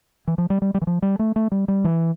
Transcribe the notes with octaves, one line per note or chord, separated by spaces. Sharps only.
E3
F3
G3
G3
G3
E3
F3
G3
A3
A3
G3
G3
E3